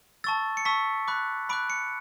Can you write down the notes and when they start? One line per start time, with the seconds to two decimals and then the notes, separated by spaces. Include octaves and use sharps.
0.24 A5 C#6 E6 A6
0.57 C#7
0.65 A5 C#6 E6 B6
1.08 B5 D6 F#6
1.49 B5 D6 F#6 D7
1.70 C#7